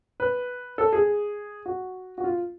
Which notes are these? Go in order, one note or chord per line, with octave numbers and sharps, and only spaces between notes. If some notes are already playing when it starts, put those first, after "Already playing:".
B4
A4
G#4
F#4
F#4
F4